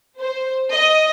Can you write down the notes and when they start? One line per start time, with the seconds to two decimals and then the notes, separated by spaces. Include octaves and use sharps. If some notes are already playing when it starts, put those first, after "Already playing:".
0.19 C5
0.72 D#5